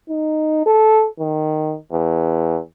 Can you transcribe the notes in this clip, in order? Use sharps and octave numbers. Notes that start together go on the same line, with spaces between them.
D#4
A4
D#3
E2